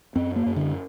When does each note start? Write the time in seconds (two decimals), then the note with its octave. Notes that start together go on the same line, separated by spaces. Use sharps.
0.16 F#2 C4
0.36 A#3
0.46 F#2
0.56 D3